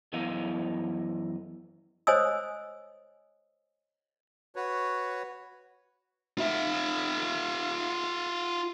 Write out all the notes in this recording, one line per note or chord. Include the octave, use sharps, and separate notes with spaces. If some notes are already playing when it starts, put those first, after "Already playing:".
F#2 E3 B3 E4 D#5 F5
C5 C#5 D#5 G#5 D#6 E6
F#4 B4 C#5
F4 E5